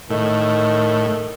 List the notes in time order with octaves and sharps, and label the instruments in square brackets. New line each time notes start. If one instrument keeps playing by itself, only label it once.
[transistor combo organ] A2 [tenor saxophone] D#3